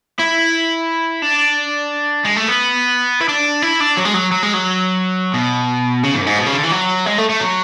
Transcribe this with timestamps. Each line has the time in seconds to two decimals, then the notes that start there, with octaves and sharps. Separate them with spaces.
0.19 E4
1.22 D4
2.25 G#3
2.36 A3
2.48 B3
3.20 E4
3.28 D4
3.62 E4
3.80 D4
3.97 F#3
4.05 G#3
4.14 F#3
4.32 F#3
4.43 G#3
4.54 F#3
5.34 B2
6.03 C#3
6.14 G#2
6.21 F#2
6.26 G#2
6.38 B2
6.46 C#3
6.54 D3
6.64 E3
6.72 F#3
7.06 G#3
7.18 A3
7.30 A3
7.40 F#3